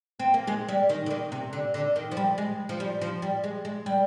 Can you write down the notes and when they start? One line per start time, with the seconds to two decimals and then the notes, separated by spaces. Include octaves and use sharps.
0.19 C4
0.34 A#3
0.47 G#3
0.68 G3
0.89 D#3
1.06 D3
1.11 D#3
1.32 C3
1.53 D3
1.74 D3
1.96 D#3
2.11 F3
2.17 G3
2.38 G#3
2.69 F3
2.80 G3
3.01 F3
3.22 G3
3.44 G#3
3.65 G#3
3.86 G3